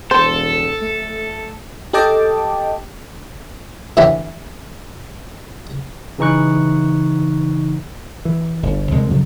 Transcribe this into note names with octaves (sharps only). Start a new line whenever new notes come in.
E1 A4 C5
A3
G4 A4 D#5 G5 A5 D6
A2 D3 E3 E4 G4
C#3 E3 D#4 C#6 F#6
E3
G1
C2 G#3 C4
F2 C#3 F#3